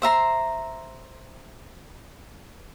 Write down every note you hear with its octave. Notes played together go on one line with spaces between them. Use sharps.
C5 E5 A#5 C6